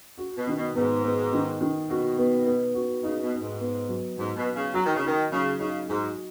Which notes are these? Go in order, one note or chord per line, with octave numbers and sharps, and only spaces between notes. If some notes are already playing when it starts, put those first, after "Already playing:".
F#4
B2
D#3
B2
G#2 B3
B3
D#3
D#3
B2 F#4
B3
B3
F#4
C#3 D#4
B2
D#4
G#2
B3
F#3
G#2 F#3
B2
B3
C#3
F#3 F#4
D#3
C#3
D#3 D#4
C#3 F#3
C#3 D#4
G#2 F#4